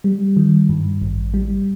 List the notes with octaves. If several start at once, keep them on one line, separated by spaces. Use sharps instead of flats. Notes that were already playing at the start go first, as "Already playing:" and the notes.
G3
D#3
G2
A1
G3